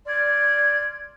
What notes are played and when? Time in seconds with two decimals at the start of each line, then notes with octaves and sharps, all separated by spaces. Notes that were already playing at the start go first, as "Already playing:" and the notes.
0.06 D5 C6 F6 G#6